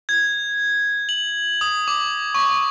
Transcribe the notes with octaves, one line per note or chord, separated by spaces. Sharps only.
G#6
F#7
D#6
D6
C#6